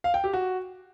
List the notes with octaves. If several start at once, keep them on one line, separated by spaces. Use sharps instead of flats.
F5
G5
G4
F#4